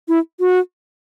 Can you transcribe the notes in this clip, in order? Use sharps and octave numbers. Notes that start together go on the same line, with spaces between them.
E4
F#4